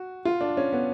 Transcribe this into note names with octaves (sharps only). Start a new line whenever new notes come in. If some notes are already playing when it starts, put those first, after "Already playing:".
Already playing: F#4
F4
D4
C#4
B3